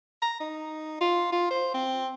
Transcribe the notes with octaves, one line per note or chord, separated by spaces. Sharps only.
A#5
D#4
F4
F4
C5
C4